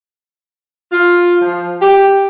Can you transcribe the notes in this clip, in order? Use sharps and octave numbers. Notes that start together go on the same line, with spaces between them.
F4
F3
G4